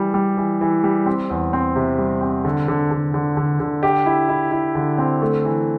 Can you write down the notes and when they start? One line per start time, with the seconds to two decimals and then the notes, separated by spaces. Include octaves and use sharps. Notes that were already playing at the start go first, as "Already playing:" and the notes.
Already playing: E3 G3
0.14 G3
0.37 E3
0.61 E3
0.84 G3
1.06 C4
1.30 E2
1.53 C4
1.76 C3
1.99 G3
2.21 C4
2.45 D3
2.68 D3
2.91 D3
3.14 D3
3.37 D3
3.60 D3
3.83 G4
4.06 E4
4.29 E4
4.52 E4
4.75 D3
4.98 C4
5.22 A3
5.45 E3